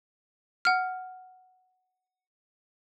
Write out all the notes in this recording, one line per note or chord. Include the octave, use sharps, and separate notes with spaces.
F#5 F6